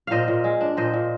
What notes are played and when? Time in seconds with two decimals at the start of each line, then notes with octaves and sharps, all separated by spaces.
0.07 A#2 C5 D#5 F5
0.28 A#2
0.44 G#3
0.61 D4
0.77 A#2 C5 D#5
0.94 A#2